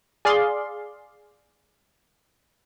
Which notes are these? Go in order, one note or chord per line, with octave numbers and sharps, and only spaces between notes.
G#4 D5 F5 C6